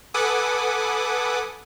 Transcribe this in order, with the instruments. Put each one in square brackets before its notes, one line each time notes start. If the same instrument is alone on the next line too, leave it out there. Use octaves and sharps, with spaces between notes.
[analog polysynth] A4 B4 F#5 G#5 D6 D#6